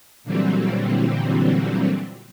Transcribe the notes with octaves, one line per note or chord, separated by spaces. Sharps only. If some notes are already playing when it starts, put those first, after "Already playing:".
A#2 D3 E3 F#3 G3 C4